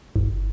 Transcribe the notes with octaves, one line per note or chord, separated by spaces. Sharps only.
G1